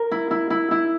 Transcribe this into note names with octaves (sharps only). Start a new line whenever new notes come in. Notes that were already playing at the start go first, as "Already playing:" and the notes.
Already playing: A#4
E4
E4
E4
E4